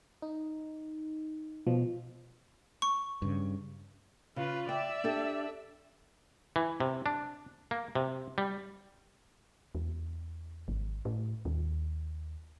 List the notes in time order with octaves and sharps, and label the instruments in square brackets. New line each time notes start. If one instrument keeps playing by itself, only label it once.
[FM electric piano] D#4
[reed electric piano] B2 [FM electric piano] F3
[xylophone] C#6
[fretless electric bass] G2 C#3
[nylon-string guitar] C#3 [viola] F4 B4
[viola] D5 E5 [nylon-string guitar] G5
[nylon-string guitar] D4 G4 A4
[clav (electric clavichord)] E3
C3
D4
A#3
C3
G3
[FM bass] E2
G#1
A2
D#2